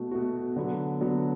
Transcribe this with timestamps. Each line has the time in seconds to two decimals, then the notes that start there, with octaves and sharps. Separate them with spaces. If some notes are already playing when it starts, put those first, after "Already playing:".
Already playing: B2 A3 F#4
0.11 B2 A3 F#4
0.56 D3 F#3 B3
1.01 D3 F#3 B3